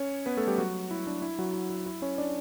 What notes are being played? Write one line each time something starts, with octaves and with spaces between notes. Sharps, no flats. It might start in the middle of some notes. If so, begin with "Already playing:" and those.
Already playing: C#4 C#5
B3 B4
A3 A4
G3 G4
F#3 F#4
E4
D4
E4
F#3 F#4
E4
E4
E4
C#4 C#5
D4 D5